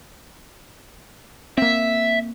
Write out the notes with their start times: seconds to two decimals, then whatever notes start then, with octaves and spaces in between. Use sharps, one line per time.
1.58 A#3 C4 E5